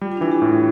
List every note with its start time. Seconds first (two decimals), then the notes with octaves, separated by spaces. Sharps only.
0.01 G3 F4
0.12 F4
0.17 D4
0.21 E3 E4
0.32 G4
0.42 A2